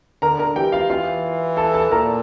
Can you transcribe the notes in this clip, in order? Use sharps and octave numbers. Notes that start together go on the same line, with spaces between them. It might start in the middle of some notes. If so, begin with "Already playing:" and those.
D3 A#4 A#5
A#4 A#5
E3 G4 G5
F4 F5
E3 F4 F5
A4 A5
A4 A5
A#2 A#4 A#5